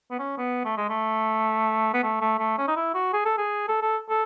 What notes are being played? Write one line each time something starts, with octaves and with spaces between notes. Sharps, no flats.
B3
C#4
B3
A3
G#3
A3
B3
A3
A3
A3
C#4
D#4
E4
F#4
G#4
A4
G#4
A4
A4
A4